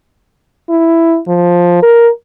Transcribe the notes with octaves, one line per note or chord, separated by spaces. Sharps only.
E4
F3
A#4